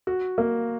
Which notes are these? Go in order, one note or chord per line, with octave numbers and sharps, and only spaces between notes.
F#4
A#3